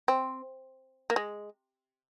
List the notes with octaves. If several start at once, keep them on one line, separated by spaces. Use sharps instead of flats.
C4
A#3
G#3